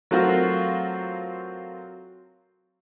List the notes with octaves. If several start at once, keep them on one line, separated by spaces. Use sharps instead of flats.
F#3 A3 C4 F4 F#4 A#4